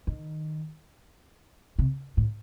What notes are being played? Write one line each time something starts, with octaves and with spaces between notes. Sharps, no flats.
D#3
C3
A2